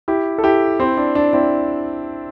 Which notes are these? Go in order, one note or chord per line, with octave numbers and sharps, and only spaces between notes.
E4 G4
A4
E4 G4
C4 E4
D4
D4
C4 E4